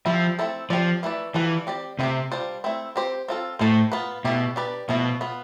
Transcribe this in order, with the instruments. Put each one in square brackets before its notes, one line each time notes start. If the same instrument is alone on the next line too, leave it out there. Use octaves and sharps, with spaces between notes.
[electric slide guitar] F3 [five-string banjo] G3 C4 E4
[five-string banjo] A3 C4 E4 A4
[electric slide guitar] F3 [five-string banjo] C4 G4 D5
[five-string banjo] E3 A3 E4 B4 D5
[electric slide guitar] E3 [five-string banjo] G3 D4 F4 A4
[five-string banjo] C4 G4 D5
[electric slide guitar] C3 [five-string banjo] A3 C4 G4
[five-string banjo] G3 D4 F4 C5
A3 C4 E4
C4 G4 C5
C4 F4 A4
[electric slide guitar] A2 [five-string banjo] A3 E4 A4 C5
[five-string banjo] B3 F4 B4
[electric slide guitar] B2 [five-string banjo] A3 E4 G4
[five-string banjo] D4 G4 B4 D5
[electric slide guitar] B2 [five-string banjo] F3 A3 E4
[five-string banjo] B3 F4 B4